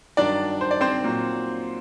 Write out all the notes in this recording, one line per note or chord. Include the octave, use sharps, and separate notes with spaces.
G2 D#3 F#3 D4 D5
C5
D5
C4 C5
A#2 F#3